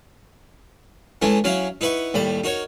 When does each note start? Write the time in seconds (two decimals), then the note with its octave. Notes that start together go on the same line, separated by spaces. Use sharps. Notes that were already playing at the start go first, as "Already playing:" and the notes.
1.22 E3 G#3 A3 C#4 E4
1.44 F#3 C#4 E4 F#4 F5
1.81 D#4 E4 B4 F#5 C#6
2.14 D#2 A2 G3 B5
2.44 D#4 F#4 A#4 C#5